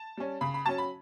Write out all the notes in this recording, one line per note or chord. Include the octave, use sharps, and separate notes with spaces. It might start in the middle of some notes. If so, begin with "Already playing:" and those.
Already playing: A5
G3 C#4
C#3 B5
B5
F#3 C#4 A5
B5